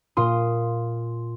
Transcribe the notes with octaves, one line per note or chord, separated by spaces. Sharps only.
A#2 F4 C6 D#6